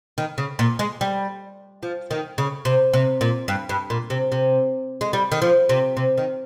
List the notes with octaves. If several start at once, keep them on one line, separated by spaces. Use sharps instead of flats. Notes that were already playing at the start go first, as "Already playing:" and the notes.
D#3
C#3
A#2
G#3
G3
F3
D#3
C#3
C3
C3
A#2
G2
G2
A#2
C3
C3
G#3
G3
D#3
F3
C3
C3
D#3